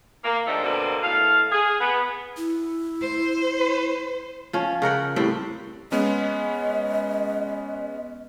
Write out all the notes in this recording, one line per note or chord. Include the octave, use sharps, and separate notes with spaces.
A#3
D#3 F3 G#3 A3 D4
B2 D3 A#3 C4 D4
A2 A4 F5
G#4
B3
E4
C5
F3 C#4
C#3 A#4 F#5 G5
A2 G3 C4
G#3 B3 C#4 D#5